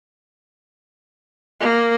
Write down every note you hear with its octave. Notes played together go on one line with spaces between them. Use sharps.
A#3